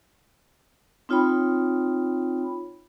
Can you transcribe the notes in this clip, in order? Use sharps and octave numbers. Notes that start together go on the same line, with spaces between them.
C4 D#4 F4 C#5 G5 B5